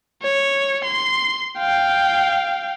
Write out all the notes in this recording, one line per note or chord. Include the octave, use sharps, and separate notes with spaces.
C#5
C6
F5 G5